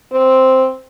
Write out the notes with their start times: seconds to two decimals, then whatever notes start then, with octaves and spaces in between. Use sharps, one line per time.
0.12 C4